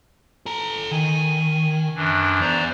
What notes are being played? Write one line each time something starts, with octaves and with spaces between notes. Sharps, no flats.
A4 A#5
D#3 G#5
F#2 E3 D4
E2 C5 D5 A#5